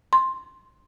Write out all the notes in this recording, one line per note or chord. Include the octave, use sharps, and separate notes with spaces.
C6